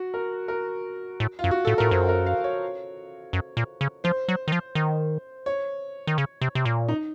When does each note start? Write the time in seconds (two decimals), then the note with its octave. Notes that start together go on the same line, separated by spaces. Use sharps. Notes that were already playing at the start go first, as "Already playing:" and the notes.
Already playing: F#4
0.14 A#4
0.48 A#4
1.20 A2
1.39 F4
1.44 F#2
1.51 F#4
1.65 A2 A4
1.78 A2 A#4
1.91 F#2 C5
2.09 A#4
2.26 F5
2.44 C#5
3.33 F#2
3.57 A#2
3.81 C#3
4.04 F3 C5
4.29 F#3
4.48 D#3
4.52 F3
4.75 D#3
5.46 C#5
6.07 D#3
6.18 C#3
6.41 C3
6.55 C3
6.65 A#2
6.88 D#4